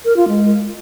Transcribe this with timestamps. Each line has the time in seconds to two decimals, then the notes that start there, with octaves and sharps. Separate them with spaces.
0.05 A#4
0.16 F4
0.28 G#3